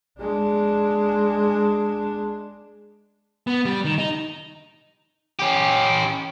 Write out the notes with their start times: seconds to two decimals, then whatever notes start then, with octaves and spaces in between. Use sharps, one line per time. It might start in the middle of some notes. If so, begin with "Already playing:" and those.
0.20 G#3 D4
3.47 B3
3.65 G3
3.85 D#3
3.98 D#4
5.39 C#4 G4